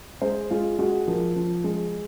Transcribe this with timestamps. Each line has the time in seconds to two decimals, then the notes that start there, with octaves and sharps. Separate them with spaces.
0.22 G#3 C5
0.51 G#3 F4
0.79 G#3 F#4
1.07 F3 A#4
1.36 F3
1.64 G#3